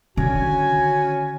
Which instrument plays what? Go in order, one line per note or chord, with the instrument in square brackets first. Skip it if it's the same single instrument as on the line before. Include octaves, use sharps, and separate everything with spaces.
[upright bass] D3 D#3 [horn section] C#4 G#5 [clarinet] F#4